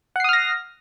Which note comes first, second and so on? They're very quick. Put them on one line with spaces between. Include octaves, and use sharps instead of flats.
F#5 C7 D#6 F6 A#6